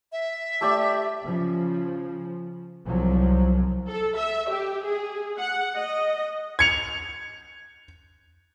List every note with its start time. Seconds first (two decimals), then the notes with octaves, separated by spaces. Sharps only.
0.12 E5
0.61 A3 G4 D5
1.24 C#3 F3
2.85 C2 F3 F#3
3.89 A4
4.18 E5
4.51 G4
4.85 G#4
5.39 F#5
5.77 D#5
6.59 G#6 C#7 F7